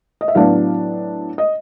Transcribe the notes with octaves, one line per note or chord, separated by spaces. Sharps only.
D#5
E5
A2 F#3 B3 D4 F5
D#5